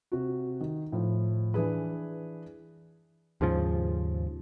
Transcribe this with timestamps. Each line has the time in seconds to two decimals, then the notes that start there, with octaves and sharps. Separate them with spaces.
0.12 C3 F#4
0.61 D#3
0.92 A2 F3
1.54 E3 D4 G#4 B4
3.41 D#2 G#2 C#3 F3